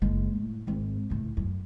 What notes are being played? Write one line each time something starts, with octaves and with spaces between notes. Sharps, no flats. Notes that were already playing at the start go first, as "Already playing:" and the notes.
F#1 G#3
A2
G#1 G#2
C#2 A2
F#2